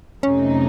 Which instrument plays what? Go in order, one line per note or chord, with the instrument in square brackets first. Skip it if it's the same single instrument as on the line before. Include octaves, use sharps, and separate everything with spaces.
[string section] F2 C3 F#3 A3 D#4 [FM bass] C#4